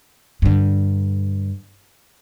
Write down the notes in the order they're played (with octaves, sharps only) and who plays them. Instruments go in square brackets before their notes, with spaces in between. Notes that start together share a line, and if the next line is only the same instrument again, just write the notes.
[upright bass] G2 D3